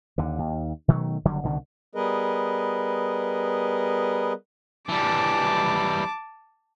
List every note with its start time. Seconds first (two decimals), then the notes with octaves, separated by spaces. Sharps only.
0.18 D#2 D3
0.39 D#2
0.88 B2 D#3 F#3 A3
1.25 F#1 D3 F#3 G3
1.44 C2 B2 D3 D#3
1.95 G3 B3 G#4 A#4 B4 D#5
4.89 E3 G3 A5 D6